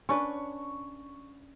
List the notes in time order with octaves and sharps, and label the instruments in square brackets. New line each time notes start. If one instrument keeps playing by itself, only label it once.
[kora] C#4 D4 B4 [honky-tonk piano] C#6